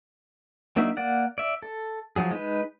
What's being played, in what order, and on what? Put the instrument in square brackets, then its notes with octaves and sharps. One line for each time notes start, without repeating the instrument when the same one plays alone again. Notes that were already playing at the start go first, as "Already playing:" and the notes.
[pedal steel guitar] F#3 A#3 D4 D#4 E5
A#3 D5 F#5
D5 E5
A4
F3 F#3 G#4
G#3 D#4 B4